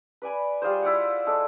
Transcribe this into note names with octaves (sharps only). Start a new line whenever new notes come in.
B4 D5 G#5 B5
G3 F4 G#4 C5
E4 F4 D5 F#5
G#3 A4 D5